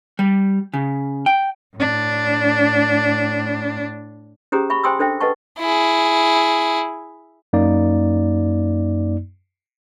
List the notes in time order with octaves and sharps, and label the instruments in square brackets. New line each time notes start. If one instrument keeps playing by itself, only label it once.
[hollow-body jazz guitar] G3
C#3
G5
[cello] A2 D4
[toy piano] C#4 G4 G#4 C5 A#5 D#6
E5 B5 C#6
C5 G5 G#5 C6 D#6 E6
D4 A4 C5 E5 G5
A4 B4 D#5 F#5 A5 C#6
[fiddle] E4 G#4
[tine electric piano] F#2 A#3 D#4 D5